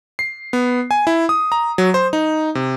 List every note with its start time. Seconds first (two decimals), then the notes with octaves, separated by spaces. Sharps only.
0.19 C7
0.53 B3
0.91 G#5
1.07 E4
1.29 D#6
1.52 A#5
1.78 F#3
1.94 C5
2.13 D#4
2.55 C3